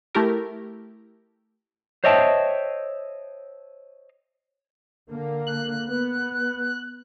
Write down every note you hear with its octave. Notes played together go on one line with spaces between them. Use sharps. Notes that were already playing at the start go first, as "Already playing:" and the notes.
A3 E4 G4 A#4
C5 C#5 D#5 E5 G5 A5
D3 A#3
F#6
B3